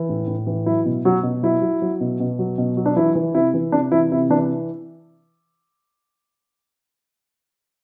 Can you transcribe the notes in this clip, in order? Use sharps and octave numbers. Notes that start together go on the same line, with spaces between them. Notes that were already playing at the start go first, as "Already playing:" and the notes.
Already playing: E3
A2
A2
E3
F#3 E4
B2
B2 F#3 F#4
B2
F#3 E4
F#3
F#3
B2
B2
F#3
B2
F#3
D4
E3 E4
E3
C3 E4
E3
C3 D4
E3 E4
C3 E4
E3 D4